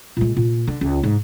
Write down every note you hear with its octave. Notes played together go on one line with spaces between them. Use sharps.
A#2 G#3
A#2
D3
C#2
G#2